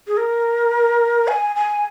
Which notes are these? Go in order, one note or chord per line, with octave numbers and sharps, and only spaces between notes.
G#4
A#4
G#5
G#5